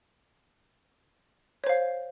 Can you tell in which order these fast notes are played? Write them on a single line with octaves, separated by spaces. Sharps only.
C#5 C5 F5